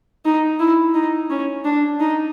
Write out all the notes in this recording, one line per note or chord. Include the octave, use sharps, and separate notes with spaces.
D#4
E4
D#4
C#4
D4
D#4